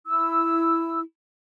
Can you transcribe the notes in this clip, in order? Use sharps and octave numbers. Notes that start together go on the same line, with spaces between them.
E4 E6